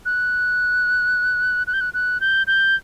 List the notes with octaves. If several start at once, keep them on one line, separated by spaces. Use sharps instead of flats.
F#6
F#6
G6
F#6
F#6
G6
G6